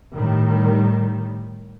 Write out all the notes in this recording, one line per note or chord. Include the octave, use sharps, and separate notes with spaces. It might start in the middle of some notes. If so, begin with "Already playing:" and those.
A2 D#3 G3